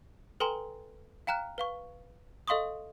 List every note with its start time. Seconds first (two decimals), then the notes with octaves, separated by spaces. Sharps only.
0.40 A4 B4 G5 G#5 A#5 C6
1.27 F5 G5 A#5 F6 F#6
1.58 B4 F5 C#6
2.48 A4 D#5 F5 C6 C#6 D#6